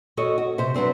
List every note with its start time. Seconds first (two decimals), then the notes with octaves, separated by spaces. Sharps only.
0.17 F#4 A4 C#5 D#5
0.38 F#4
0.58 C3 C5
0.74 F#3 B3 C4 D4